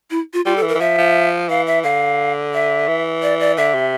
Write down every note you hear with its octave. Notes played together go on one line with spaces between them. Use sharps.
E4
F4
G3 F4
A4
E3
A#4
E3
F3 E5
F3
E3 F5
E5
D3 F5
E5
E3
D5
D5
D3 E5
C3